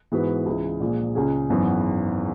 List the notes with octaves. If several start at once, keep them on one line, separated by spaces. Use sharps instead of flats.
G#2 E3 B3 F#4 B4
C#2 C#3 E3 G#3
A#1 A#2 G#3
C#2 C#3 G#3 C#4 G#4
G#1 F#2 E3 B3